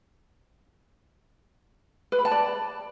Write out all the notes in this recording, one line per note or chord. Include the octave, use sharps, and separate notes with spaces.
B4
B5
A5
D5